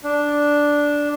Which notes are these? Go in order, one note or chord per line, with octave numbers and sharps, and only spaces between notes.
D4